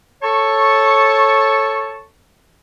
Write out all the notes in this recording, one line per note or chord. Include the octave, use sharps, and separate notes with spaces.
A4 C#5 A5 C#6